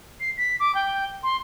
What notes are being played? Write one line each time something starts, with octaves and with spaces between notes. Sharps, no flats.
C7
B6
D6
G5
C6